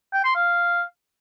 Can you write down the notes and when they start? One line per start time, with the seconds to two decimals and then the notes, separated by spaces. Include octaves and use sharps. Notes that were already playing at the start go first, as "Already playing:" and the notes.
0.13 G5
0.24 C6
0.35 F5